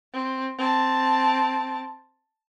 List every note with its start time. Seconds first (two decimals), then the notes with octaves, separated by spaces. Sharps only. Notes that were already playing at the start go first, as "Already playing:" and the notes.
0.14 C4
0.58 C4 A5